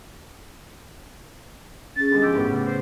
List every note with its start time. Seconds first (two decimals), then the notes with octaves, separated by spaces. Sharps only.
1.96 C#4 G#4 A6
2.11 D3 G3 G#3
2.22 F3 G4 G#4 E6
2.35 A2 B3
2.50 C#3
2.66 C5